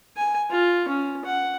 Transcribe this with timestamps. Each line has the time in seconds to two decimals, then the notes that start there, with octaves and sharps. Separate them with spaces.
0.17 G#5
0.50 F4
0.88 C#4
1.25 F#5